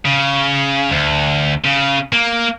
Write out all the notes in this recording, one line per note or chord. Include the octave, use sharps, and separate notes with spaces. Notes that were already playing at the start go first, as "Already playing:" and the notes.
C#3
D2
C#3
A#3